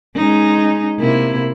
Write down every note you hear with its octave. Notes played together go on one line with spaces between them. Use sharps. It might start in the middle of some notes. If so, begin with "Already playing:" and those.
G#3 C#4 D#4
C3 A#3 E4